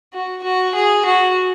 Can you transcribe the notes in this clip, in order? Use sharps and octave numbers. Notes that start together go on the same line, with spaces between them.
F#4
F#4
G#4
F#4